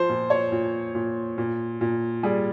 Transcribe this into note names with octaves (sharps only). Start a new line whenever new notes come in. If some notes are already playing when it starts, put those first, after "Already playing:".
Already playing: F3 C5
A#2
C#5
A#2
A#2
A#2
A#2
G3 G#4